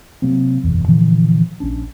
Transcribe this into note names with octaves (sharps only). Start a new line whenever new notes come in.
C3 F#3 A#3 C4
F#1 B1 E2
A#2 D3 E3 F3
A#1 C#4 D4